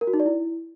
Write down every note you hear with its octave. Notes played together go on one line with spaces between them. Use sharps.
A#4
F#4
D#4
D5
E4